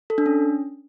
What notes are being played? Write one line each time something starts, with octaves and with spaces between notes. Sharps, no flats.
A4
D4
C#4